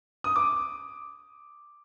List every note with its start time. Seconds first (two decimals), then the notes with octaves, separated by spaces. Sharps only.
0.24 D#6
0.36 D6